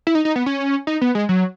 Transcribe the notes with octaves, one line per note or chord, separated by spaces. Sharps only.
E4
D#4
D#4
B3
C#4
D#4
B3
G#3
F#3